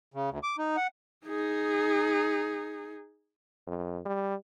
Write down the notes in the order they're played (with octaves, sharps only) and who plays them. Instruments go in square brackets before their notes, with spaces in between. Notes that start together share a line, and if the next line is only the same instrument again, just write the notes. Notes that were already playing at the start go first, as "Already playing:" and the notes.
[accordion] C#3
D2
D6
D#4
F#5
[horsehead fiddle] D#4 G#4
[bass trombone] F2
G3